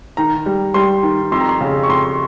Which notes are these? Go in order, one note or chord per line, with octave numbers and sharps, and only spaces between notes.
D#3 A#5
G3
G3 C6
D#3
F2 C6
A#5
C6
C#3
C#6
F2 C6